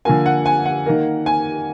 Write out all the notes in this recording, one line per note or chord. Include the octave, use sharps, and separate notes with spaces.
D3 F3 A#3 G#5
F#5
G#5
F#5
D#3 A#3
G#5